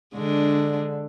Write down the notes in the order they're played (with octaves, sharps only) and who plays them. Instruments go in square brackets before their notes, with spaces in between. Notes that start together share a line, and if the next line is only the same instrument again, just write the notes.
[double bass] D3 [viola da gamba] G#3 D4